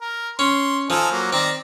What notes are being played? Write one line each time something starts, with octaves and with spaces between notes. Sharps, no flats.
A#4
C#4 C6
F3 D#4 A4 G#5
F#3 A#3
D#3 C4 D5 A#5